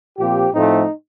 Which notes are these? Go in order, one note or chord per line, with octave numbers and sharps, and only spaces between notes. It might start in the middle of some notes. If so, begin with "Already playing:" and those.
A#2 F3 C4 G4
A2 F3 A3 C4 D#4